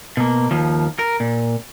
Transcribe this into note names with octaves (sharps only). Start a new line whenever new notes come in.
B2 A#3
D#2 F3
A#4
A#2